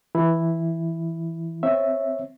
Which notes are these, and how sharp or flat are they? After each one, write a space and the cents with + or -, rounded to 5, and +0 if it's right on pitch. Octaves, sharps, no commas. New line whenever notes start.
E3 +0 E4 +0
C4 -10 C#5 -15 E5 +0